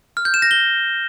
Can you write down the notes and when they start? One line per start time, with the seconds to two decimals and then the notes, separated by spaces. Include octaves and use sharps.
0.17 F6
0.25 G6
0.34 E7
0.42 A#6
0.51 G7